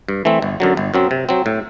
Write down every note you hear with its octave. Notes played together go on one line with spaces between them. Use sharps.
G2
E3 A3 C4
G1
F#2 D3 F#3
G1
F#2 F#3 C4
C3
F#3 C4
A2